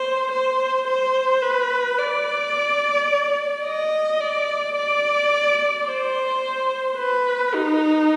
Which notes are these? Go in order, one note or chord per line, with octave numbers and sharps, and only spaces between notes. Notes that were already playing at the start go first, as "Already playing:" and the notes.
Already playing: C5
C5
C5
B4
D5
D#5
D5
D5
C5
B4
D#4